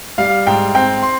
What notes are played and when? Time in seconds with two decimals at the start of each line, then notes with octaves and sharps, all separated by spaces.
0.18 G3 F5
0.47 G#2 G5
0.75 C4 G5
1.02 C6